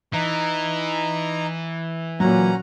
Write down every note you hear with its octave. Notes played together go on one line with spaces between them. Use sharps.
E3 D#4 A#5
A#2 F#3 C#4 F#5 A#5